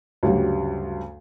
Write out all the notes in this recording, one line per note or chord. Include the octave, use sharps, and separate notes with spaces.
D2 G2 C#3 F#3 G3